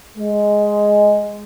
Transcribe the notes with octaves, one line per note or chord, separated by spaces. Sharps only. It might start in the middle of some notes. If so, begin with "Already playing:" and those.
G#3